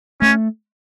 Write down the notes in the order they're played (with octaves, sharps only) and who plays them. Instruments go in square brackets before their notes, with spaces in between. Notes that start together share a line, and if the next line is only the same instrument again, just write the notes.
[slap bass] A3 [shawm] C#4